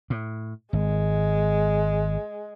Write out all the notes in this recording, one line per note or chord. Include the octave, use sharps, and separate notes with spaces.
A2
G#1 G#3